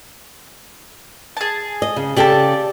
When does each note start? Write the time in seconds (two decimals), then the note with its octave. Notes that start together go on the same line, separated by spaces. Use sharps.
1.37 G#4 A5
1.82 D#5
1.96 C#3
2.16 C#3 G4 A4 D5 A5